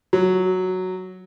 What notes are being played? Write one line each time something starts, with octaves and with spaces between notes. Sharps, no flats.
F#3